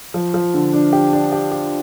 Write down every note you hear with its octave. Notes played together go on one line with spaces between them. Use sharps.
F3
F3
D3
D4
G4
D4
G4
G4